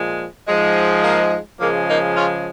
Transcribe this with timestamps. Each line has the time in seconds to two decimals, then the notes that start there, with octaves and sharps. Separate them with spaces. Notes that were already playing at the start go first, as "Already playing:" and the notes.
Already playing: A#2 F3 G#3
0.48 G#2 F3 G#3
1.04 A#3
1.61 C#3 F3 G#3 A#3
1.89 A#3 D#4
2.17 C#4 F4